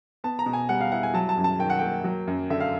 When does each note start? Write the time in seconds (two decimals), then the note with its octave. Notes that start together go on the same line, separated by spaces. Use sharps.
0.24 B3 A5
0.39 A#5
0.46 B2
0.53 G#5
0.69 G3 F#5
0.81 F5
0.92 E4 F#5
1.03 G#5
1.14 F#3 A5
1.29 A5
1.37 F#2
1.44 A5
1.59 D#3 G5
1.70 F#5
1.79 A#3 G5
2.04 F#3
2.27 F#2
2.50 D3 E5
2.60 F5